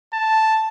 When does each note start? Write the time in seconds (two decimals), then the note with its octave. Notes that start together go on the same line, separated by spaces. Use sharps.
0.13 A5